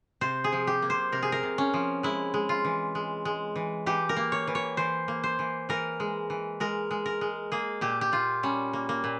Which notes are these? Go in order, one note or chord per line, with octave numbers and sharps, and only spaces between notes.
C3 C5
G#4
F3
G4
A#3
C5
C3 A#4
G#4
A#4
C3
C#4
F3
G#3 E4
G#3
F4
E3
G#3
G#3
E3
E3 G4
A#4
A#3
C#5
E3
C#5
E3 C5
A#3
C5
E3
E3 A#4
G#3
E3
G#3 A#4
G#3
A#4
G#3
A#3 G#4
A#2 G4
G4
A#2 F4
G3 C#4
A#3
A#3
A#2